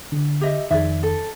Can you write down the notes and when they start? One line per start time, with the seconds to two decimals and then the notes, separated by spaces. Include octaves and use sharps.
0.12 D3
0.41 G4 D#5 E5
0.71 F2 D#3 G#4 D5 E5
1.03 A4